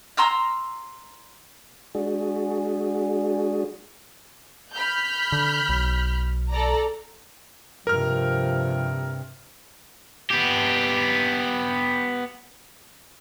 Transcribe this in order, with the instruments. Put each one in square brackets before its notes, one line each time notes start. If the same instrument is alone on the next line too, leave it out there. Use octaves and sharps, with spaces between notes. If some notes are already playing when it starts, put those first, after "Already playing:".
[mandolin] A#5 C6 E6 F6
[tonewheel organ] G#3 D4 F#4 G#4
[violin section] B5 F6 G6
[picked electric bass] D3
B1
[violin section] A4 D5 A#5
[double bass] G2 C3 [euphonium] F3 [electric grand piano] A#4 F6
[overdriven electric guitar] B3 G4